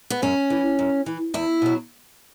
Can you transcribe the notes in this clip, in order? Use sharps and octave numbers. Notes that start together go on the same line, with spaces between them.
B3
F#2 C#4
E3
F#2
E3
E2 E4
B2 F#3